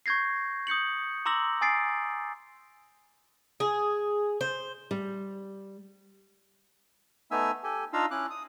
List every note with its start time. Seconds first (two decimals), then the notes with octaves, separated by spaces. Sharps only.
0.06 C#6 G6 G#6 A#6 C7
0.67 D#6 G6 C#7 F#7
1.26 A#5 C6 D6 E6 A#6 F#7
1.61 G#5 D#6 A6 C7 D7
3.60 G#4
4.41 C5
4.91 G3
7.31 A3 B3 D#4 E5 G#5 E6
7.64 G4 A4 G#5
7.93 D4 D#4 F4 F5 A#5 E6
8.11 C#4 E4 D6 F#6
8.30 D#6